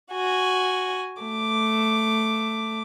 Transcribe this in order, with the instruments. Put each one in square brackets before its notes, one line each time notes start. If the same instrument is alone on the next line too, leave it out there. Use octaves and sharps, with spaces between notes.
[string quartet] F#4 G#5
A3 D6